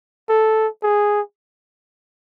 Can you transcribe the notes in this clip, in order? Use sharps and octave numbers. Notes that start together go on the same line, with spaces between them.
A4
G#4